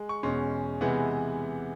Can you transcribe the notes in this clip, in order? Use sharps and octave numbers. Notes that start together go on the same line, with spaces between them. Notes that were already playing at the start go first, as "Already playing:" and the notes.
Already playing: G#3
C#6
E2 B2 G#3 C#4 C6
C3 E3 G#3 B3 F#5